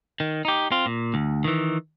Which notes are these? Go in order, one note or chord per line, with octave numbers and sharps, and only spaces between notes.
D#3
D#4 G4
C4 F4
A#2
D2
D#3 E3